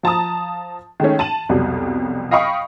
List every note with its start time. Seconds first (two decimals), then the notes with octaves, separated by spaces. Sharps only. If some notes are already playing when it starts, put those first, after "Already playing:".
0.03 F3 A5 A#5 D#6
1.00 D#3 G#3 A3 C#4
1.19 A5 D#7 F#7
1.49 C2 F2 B2 F#3 G3
2.31 D#5 F5 G5 B5 C#6 D#6